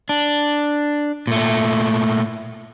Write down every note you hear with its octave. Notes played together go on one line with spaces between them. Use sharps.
D4
A#2 A3